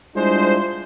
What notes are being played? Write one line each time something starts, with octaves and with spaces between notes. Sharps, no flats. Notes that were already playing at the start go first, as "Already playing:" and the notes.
G3 G#3 D4 E4 F4 C5